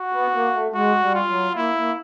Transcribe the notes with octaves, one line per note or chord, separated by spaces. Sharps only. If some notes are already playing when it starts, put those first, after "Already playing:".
Already playing: F#4
B3
A#3
A3
G#3 F#4
G3
F4
F#3
A#3 E4
A#3